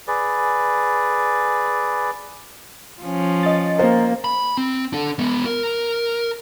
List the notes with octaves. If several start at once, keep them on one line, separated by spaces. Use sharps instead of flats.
G#4 B4 D5
F3 C#4
D#5 A6
A#3 C5
B5
C4
D4 A4
G#3 B3
A#4